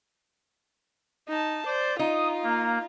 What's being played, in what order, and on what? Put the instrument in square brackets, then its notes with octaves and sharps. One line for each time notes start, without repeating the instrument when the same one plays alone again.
[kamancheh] D#4 A5
[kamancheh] C5 [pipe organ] D5
[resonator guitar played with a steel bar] D#4 [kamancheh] F4 [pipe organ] D#6
[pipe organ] A#3